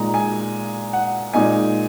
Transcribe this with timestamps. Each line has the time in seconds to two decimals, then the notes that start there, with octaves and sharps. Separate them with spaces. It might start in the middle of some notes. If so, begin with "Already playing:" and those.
Already playing: A#2 G#3 D#4 A#5
0.14 G#5
0.93 F#5
1.33 A#2 G#3 D#4 G#5